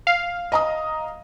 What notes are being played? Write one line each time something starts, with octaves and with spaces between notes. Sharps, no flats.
F5
D#5 A#5 D#6